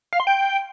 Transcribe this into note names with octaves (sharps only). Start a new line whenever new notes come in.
F5
C6
G5